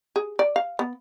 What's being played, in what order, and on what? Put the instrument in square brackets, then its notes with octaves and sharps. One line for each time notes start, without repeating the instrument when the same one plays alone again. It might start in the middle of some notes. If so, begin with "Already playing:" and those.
[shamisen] G#4
D5
F5
B3